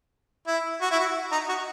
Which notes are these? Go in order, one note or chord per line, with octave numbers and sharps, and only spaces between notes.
E4
F#4
E4
F#4
D#4
F#4